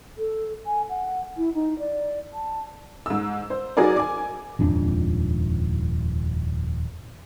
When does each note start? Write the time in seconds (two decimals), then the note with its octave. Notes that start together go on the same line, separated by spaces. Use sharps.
0.18 A4
0.66 G#5
0.90 F#5
1.38 E4
1.54 D#4
1.79 D5
2.33 A5
3.06 G#2 E6
3.50 C5
3.77 F#3 D#4 F#4 G#4 A#4 D5
3.96 G#5 D6
4.59 D#1 F2 G#2 D4